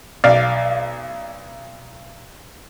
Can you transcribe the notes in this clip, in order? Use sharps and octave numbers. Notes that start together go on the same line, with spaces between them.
B1 D5 F5